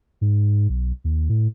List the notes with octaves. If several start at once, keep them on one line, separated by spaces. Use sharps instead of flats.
G#2
B1
D#2
A2